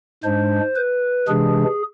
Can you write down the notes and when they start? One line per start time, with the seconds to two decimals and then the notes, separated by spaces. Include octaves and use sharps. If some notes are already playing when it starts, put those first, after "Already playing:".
0.24 G#2 G#3 D4 C5
0.76 B4
1.28 C3 E3 G#3 D4 G#4